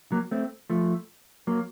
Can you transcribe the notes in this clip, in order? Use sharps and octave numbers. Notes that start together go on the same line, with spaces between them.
F#3 A#3
A3 C4
F3 A3
F#3 A#3